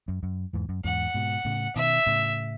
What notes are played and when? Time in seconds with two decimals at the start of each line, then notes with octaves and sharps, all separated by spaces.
0.08 F#2
0.23 F#2
0.53 E2 G#2
0.69 F#2
0.84 E2 G#2 F#5
1.14 G#2 B2
1.45 A2 C#3
1.75 B2 D#3 E5
2.07 A2 C#3